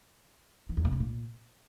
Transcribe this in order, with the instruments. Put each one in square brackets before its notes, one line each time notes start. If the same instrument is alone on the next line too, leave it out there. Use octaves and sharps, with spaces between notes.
[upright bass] E3
E2
B2
C3
A#2